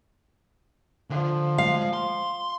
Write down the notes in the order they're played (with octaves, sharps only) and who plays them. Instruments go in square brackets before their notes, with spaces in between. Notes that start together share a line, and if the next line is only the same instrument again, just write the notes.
[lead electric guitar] D3 [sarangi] F3
[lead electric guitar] G#3 [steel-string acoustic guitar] F5
[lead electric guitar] C6